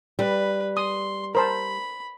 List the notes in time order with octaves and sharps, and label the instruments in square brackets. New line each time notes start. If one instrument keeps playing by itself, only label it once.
[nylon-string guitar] G3 [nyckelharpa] B4
[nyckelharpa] C6 [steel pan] D#6
[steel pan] A#4 C5 A5 [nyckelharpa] B5